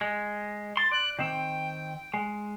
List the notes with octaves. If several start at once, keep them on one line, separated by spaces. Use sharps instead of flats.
G#3
C6 A6
D5 F#6
D#3 C4 G5
G#3